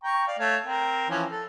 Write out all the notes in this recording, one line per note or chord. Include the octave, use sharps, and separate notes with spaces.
G5 A#5 C#6
D5 F5
A3 C#5 F5
C4 A#4
E3 F3 C#4
A4